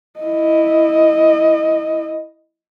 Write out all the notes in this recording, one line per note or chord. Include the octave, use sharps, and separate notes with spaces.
E4 D#5